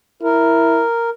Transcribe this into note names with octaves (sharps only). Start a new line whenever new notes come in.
E4 A#4